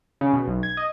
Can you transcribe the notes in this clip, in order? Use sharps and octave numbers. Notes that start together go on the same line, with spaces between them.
C#3
B2
B1
G#6
D#5